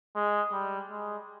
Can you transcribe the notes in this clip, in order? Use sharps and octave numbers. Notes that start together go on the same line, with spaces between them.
G#3
G3
G#3